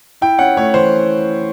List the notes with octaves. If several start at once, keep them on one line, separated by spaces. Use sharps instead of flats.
E4 G5
C#4 F#5
A3 C#5
E3 C5